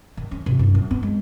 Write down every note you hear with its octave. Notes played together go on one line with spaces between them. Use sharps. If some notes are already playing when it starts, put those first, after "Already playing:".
D#3
C#4
C3
F#2
F#2
B3
G#3